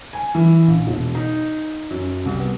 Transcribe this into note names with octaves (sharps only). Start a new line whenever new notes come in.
G#5
E3
A#1
E1
D#4
F#2
C2
B3